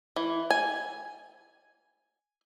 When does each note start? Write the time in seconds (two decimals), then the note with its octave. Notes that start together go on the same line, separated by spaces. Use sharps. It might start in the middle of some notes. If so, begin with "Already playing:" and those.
0.16 E3
0.50 G#5